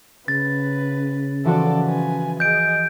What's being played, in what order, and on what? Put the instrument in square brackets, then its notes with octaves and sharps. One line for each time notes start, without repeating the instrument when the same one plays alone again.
[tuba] C#3 [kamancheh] B4 [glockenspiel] A6
[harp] E3 F3 F#4 [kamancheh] A4 D5
[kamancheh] B4 G#5
[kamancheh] G#4 D#5 [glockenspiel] G6 D7